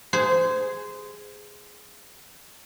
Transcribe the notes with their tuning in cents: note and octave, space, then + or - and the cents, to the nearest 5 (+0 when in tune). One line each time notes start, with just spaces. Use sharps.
G#4 +0 C5 -20